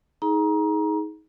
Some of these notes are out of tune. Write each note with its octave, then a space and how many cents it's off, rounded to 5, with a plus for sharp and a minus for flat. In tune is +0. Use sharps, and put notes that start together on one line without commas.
D#4 +25 G#4 +20 A#5 +25